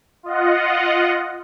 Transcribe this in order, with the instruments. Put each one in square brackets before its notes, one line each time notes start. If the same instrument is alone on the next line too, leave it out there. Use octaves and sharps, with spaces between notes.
[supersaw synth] F4 D#5 F#5